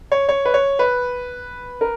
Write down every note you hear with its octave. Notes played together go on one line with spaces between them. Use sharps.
C#5
C#5
B4
C#5
B4
A#4